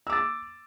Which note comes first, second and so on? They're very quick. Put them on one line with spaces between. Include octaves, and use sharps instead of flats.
E6 D6 A6